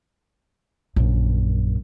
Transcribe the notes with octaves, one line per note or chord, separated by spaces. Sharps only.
A#1 F#2